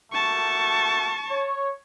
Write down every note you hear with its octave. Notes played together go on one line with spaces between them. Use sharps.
A3 A#3 F#4 A5 C#6
C#5